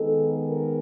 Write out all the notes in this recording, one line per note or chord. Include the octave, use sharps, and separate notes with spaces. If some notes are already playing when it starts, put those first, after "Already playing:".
Already playing: D#3 G#3 B3 A4
A#4